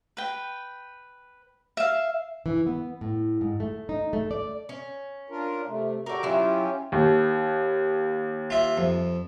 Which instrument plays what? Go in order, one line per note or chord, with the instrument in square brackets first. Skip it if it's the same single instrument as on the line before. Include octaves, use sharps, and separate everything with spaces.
[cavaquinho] B4 G5
E5 F5
[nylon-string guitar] E3
B3
A2
G#2
A3
D#4
A3
D5
[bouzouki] C#4
[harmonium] D4 F4 A#4
C3 A3
[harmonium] F#4 G4 A4 [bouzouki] A#4 D5
[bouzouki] F#3 E4 [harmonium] C#4 F4 G4
[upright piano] D#2
[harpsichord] F4 E5
F2